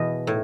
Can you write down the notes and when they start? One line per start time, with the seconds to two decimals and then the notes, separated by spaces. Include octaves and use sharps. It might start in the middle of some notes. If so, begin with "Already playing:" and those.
Already playing: E2 B2 B4 D#5
0.27 A2